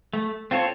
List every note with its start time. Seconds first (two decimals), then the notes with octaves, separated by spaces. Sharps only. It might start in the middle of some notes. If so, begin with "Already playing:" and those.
0.13 A3
0.51 C4 F4 A4 C#5